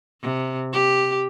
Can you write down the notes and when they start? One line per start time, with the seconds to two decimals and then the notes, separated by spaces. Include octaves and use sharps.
0.22 C3
0.73 G4